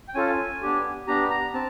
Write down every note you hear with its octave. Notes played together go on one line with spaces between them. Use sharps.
G5
C#4 F4 A4 G#5
B3 D4 G4
B3 D4 G4 A#5
A#5
C4 A5